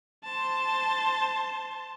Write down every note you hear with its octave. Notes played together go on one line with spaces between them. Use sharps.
C5 A5